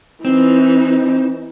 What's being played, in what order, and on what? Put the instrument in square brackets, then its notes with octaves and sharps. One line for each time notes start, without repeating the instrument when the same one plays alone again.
[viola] E3 D#4 [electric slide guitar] C4